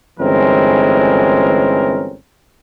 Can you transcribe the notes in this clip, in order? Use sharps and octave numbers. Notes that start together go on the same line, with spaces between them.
G1 E3 G#3 C4 C#4 A#4